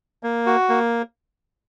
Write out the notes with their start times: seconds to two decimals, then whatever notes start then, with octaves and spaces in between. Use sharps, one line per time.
0.23 A#3
0.46 F#4
0.69 A#3